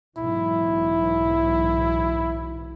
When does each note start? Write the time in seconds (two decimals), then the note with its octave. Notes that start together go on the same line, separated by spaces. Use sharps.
0.17 B1 G#2 E3 E4